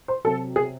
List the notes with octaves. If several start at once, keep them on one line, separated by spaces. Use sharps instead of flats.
C5
C3 F#3 A4
G#4